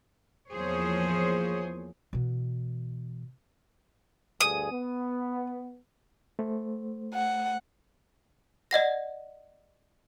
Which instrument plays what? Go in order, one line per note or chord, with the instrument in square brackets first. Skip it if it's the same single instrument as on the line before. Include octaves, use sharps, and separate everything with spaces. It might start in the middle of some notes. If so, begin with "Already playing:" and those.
[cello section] E2 F3 A#3 G#4 C5 C#5
[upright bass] B2 E3
[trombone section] D2 G2 G#4 [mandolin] D#6
[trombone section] B3
[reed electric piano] A3 C5
[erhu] F#5
[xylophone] D5 D#5 F#5 A#6